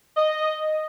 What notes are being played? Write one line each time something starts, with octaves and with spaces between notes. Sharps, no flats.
D#5